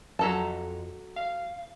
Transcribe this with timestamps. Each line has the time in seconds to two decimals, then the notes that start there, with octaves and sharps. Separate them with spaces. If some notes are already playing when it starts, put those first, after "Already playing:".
0.19 F2 F#3 A4 A5 A#5
1.16 F5